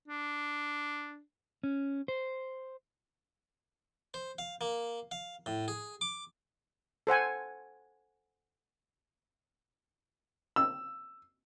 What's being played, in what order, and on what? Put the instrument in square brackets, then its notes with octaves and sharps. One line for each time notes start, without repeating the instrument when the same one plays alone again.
[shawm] D4
[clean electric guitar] C#4
C5
[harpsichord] C5
F5
A#3
F5
A2
G#4
D6
[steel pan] A4 C5 F#5 G#5
[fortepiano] E6